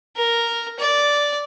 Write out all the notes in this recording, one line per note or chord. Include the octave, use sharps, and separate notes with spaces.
A#4
D5